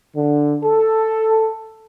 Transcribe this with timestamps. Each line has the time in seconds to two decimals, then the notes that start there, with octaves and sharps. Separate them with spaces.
0.16 D3
0.64 A4